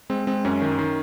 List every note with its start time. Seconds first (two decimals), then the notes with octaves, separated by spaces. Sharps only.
0.10 G#3 C4
0.27 G#3 C4
0.45 F#2 C#4
0.61 D#3
0.79 D#3